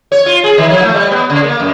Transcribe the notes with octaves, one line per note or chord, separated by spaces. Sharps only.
C#5
F4
G#4
D#3
F3
A3
G3
B3
C#3
A#3
F#2